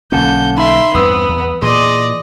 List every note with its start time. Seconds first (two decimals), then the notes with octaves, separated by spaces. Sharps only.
0.12 B1 D3 A#3 C#4 F#5 A5 G6
0.57 D#4 E5 B5 C6
0.94 E2 G2 B3 C4 B5 D#6 E6
1.29 E2
1.62 A#2 E3 G#4 D5 D#5 C6